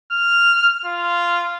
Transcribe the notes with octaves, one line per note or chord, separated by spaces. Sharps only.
F6
F4